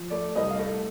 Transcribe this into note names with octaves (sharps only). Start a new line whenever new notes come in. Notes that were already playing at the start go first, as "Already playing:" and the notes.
Already playing: F3
A3 D5
C2 D#5
F5
A3